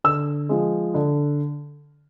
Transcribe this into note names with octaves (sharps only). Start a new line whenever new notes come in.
D3 E6
F3 G#3
D3